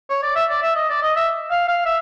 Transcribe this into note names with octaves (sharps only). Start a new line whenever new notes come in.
C#5
D5
E5
D5
E5
D#5
D5
D#5
E5
F5
F5
E5